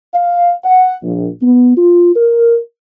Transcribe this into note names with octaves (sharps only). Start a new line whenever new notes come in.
F5
F#5
A#1
B3
F4
A#4